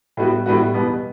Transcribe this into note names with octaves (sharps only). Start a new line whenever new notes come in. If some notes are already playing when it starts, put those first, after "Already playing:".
A2 G3 B3 F#4
A2 G3 B3 F#4
E2 B2 G3 B3